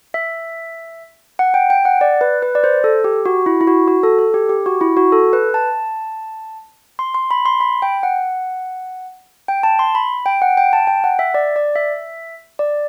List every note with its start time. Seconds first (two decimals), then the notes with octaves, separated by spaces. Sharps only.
0.14 E5
1.39 F#5
1.54 G5
1.70 G5
1.85 F#5
2.01 D5
2.21 B4
2.42 B4
2.55 D5
2.64 C5
2.84 A4
3.04 G4
3.26 F#4
3.46 E4
3.61 E4
3.67 F#4
3.88 F#4
4.03 A4
4.19 A4
4.34 G4
4.49 G4
4.66 F#4
4.81 E4
4.97 F#4
5.12 A4
5.33 B4
5.54 A5
6.99 C6
7.14 C6
7.31 B5
7.46 C6
7.61 B5
7.82 G5
8.03 F#5
9.48 G5
9.63 A5
9.79 C6
9.95 B5
10.26 G5
10.42 F#5
10.57 G5
10.73 A5
10.87 G5
11.04 F#5
11.19 E5
11.34 D5
11.56 D5
11.76 E5
12.59 D5